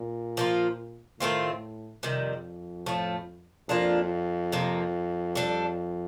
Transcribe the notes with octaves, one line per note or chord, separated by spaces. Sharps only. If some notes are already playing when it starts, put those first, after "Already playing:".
Already playing: A#2
F3 A#3 F4
A2 D#3 A3 C4 F4
F2 C3 D#3 G3
A2 F3 A3
F2 F3 A#3 D4 F4
C3 F3 A#3
G3 D4 A4